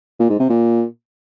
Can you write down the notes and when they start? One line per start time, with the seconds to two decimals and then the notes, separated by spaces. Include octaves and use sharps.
0.19 A#2
0.29 G#2
0.39 C3
0.49 A#2